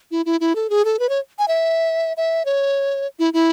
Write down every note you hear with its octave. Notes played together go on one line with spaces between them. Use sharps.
E4
E4
E4
A4
G#4
A4
B4
C#5
G#5
E5
E5
C#5
E4
E4